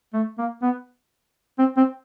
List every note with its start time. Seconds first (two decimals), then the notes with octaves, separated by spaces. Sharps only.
0.13 A3
0.38 A#3
0.62 B3
1.59 C4
1.77 C4